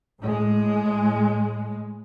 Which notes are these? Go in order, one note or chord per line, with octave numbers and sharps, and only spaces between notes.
A2 G#3